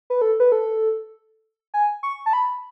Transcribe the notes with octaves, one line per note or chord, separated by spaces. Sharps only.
B4
A4
B4
A4
G#5
C#6
A5
B5